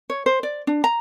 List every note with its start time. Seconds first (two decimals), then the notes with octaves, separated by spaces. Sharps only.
0.10 C#5
0.26 C5
0.43 D5
0.67 D4
0.84 A#5